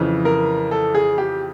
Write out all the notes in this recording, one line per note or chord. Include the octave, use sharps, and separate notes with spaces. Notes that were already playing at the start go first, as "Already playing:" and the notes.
Already playing: F2 C#3 E3
A#4
A4
G#4
G4